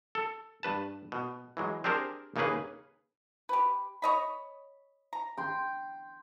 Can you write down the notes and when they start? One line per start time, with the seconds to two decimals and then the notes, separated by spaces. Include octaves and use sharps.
0.15 A4
0.63 G2 B4 A5
1.12 B2
1.57 E3 F#3 G#3
1.84 C4 D4 G4 G#4 A#4 C5
2.36 D#2 C#3 A#3 D#4 G#4 B4
3.49 G4 B4
4.02 C#5 D#5 B5
5.13 A#5
5.37 G5 C6